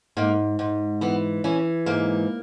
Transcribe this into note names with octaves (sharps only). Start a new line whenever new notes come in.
G#2 A#3
G#2
E3 B3
E3 C#4
G#2 A#3